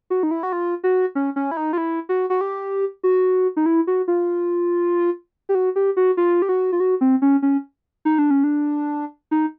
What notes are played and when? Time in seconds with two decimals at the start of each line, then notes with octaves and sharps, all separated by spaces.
0.10 F#4
0.23 D#4
0.31 E4
0.43 F#4
0.53 F4
0.84 F#4
1.15 C#4
1.36 C#4
1.51 E4
1.57 D#4
1.73 F4
1.78 E4
2.09 F#4
2.30 F#4
2.41 G4
3.03 F#4
3.57 D#4
3.66 E4
3.87 F#4
4.08 F4
5.49 G4
5.55 F#4
5.76 G4
5.97 F#4
6.17 F4
6.42 G4
6.49 F#4
6.72 F4
6.80 F#4
7.01 C4
7.22 C#4
7.42 C#4
8.05 D#4
8.18 D4
8.31 C#4
8.44 D4
9.31 D#4